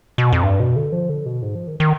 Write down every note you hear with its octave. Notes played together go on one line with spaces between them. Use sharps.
B2
F2
G2
B2
D3
F3
D3
B2
G#2
F3
D#3
D#3